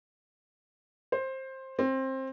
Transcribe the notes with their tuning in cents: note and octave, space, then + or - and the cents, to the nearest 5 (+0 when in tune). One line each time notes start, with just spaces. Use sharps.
C5 +15
C4 +20